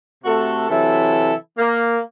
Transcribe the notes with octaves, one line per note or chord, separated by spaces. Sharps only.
C3 A3 F#4 A4
C3 E3 F#3 E4 A4
A#3